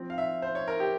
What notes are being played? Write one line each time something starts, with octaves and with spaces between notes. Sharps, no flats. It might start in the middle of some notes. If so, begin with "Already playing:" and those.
Already playing: F3 C4
F5
E5
C5
C#5
A#4
G4